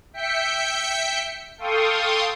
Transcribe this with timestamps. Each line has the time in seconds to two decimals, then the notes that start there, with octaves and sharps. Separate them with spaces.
0.13 E5 G5 G6 B6 C#7
1.58 A4 F5 G5 C6 C#6 D#6